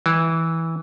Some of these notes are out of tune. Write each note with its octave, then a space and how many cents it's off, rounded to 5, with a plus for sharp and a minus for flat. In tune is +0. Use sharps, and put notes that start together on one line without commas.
E3 -10